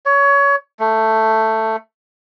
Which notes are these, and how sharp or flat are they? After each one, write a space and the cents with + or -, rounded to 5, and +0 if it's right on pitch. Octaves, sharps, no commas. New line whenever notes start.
C#5 +20
A3 +10